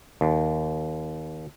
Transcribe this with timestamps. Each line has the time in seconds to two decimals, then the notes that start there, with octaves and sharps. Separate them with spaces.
0.21 D#2